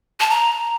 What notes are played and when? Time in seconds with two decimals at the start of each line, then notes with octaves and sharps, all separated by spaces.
0.20 A5
0.30 A#5